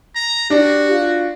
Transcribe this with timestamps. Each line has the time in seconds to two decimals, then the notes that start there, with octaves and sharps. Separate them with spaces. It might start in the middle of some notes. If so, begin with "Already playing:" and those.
0.15 A#5
0.50 D4 F#4 G4
0.91 F4